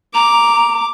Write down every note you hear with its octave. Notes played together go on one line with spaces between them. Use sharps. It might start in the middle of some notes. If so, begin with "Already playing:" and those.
A#5 D6